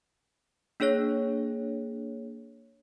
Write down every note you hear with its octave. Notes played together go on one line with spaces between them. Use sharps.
A#3 D4 G#4 C#5 A#6